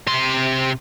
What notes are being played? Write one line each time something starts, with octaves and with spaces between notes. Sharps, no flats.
C3 C6